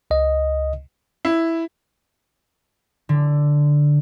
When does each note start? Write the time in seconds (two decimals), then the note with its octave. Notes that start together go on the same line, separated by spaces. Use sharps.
0.11 C#2 D#5
1.25 E4
3.09 D3